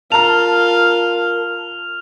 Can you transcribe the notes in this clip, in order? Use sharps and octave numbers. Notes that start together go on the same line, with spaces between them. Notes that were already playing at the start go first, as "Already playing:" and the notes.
F4 A#4 F5 A5 A#5 F6 F7